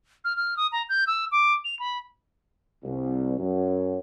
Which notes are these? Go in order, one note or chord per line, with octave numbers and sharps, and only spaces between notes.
F6
F6
D#6
A#5
G6
E6
D6
F7
B5
C2
F#2